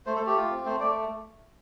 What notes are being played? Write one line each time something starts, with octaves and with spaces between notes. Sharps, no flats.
A3 C5
A4
A3
G4
F4
C4
A3 C5
A3 D5